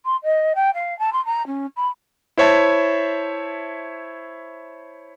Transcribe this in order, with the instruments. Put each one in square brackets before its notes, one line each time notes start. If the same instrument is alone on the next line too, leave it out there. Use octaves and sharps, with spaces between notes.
[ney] C6
D#5
G5
F5
A5
C6
A#5
C#4
B5
[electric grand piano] E4 C5 C#5 E5 A5